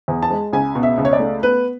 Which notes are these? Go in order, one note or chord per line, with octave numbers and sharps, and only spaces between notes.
E2
A5
G#3
C#2 G#5
B2
E5
C#2
C#5
D5
A3
B3 B4